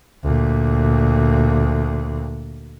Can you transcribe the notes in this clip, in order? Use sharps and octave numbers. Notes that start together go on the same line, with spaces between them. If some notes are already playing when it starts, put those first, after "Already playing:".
D2 A#2